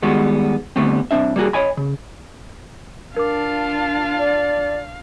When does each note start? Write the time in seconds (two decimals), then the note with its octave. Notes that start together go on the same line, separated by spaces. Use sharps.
0.02 D#3 G3 G#3 B3 F#4
0.76 D3 G3 A3 B3 C4
1.11 C2 F2 C4 D4 E5
1.36 G3 A#3 F#4 G#4
1.53 C#5 D#5 G#5 B5
1.77 C#3
3.16 D4 F4 A#4 F5 D6
4.19 D5